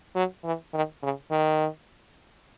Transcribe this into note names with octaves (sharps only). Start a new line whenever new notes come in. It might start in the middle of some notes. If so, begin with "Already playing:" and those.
F#3
E3
D#3
C#3
D#3